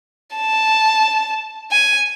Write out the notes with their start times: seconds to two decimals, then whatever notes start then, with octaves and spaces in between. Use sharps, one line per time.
0.36 A5
1.71 G#5